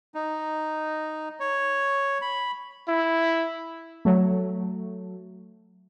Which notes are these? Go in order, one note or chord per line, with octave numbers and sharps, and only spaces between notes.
D#4
C#5
B5
E4
F#3 A3